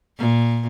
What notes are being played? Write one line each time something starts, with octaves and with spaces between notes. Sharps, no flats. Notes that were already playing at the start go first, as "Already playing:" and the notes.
A#2